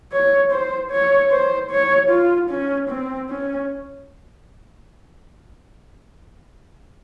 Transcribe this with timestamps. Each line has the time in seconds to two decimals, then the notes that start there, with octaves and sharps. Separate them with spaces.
0.12 C#5
0.52 C5
0.91 C#5
1.31 C5
1.71 C#5
2.11 F4
2.50 C#4
2.90 C4
3.30 C#4